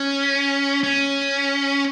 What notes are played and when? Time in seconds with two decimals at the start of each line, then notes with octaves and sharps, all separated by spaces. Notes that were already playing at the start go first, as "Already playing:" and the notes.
Already playing: C#4
0.83 C#4